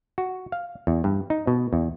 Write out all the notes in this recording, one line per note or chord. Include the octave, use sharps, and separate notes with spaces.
F#4
F5
E2
G2
D#4
B2
E2